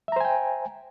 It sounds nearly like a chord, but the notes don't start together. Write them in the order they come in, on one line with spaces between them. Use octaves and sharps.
E5 A#5 C5 G#5 G5